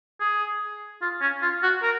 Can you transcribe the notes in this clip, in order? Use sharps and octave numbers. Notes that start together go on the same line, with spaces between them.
G#4
F4
C#4
F4
F#4
A#4